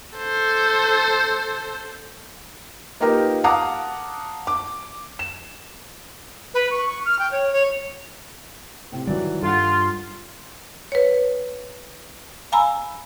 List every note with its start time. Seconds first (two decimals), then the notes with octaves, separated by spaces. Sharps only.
0.17 A4 C5
3.01 A#3 D#4 F4 G4 A#4 B4
3.44 F5 F#5 A5 A#5 D6 D#6
4.47 D6
5.19 E7
6.54 B4
6.70 C#6
6.85 C#6
7.05 F6
7.19 G5
7.31 C#5
7.52 C#5
8.92 A2 C3
9.07 D#3 E3 F#3 G3 D5
9.42 G2 F4 A4 F#5 C6
10.92 B4 C#5
12.52 F5 G#5 A#5 B5 E6